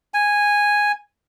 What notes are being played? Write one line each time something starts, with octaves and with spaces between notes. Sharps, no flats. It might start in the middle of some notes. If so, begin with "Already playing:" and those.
G#5